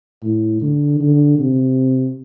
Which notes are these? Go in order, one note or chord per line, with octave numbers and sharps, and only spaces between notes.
A2
D3
D3
C3